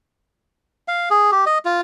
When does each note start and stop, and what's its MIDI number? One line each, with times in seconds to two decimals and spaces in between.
0.88 1.09 77
1.11 1.31 68
1.32 1.45 67
1.46 1.58 75
1.65 1.81 65